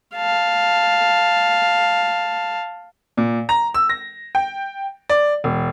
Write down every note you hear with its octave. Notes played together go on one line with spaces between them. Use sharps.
F5 A5
A#2
A#5
E6
A#6
G5
D5
E1